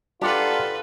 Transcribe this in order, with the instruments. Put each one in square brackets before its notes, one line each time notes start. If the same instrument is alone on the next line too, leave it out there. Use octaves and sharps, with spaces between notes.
[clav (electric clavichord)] D4 D5 [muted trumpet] F4 [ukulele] G4 F#5 A#5 [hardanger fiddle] A4 B4